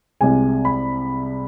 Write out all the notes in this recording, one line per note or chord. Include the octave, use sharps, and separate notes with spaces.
C2 C3 G#3 G#5
B5